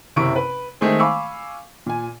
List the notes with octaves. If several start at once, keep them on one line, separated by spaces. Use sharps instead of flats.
F#1 C3 E4 C#6 D7
B4
D#3 G#3 A3 C4 G#4 C5
F5 G#5 B5 C#6 D6 E6
A#2 G#5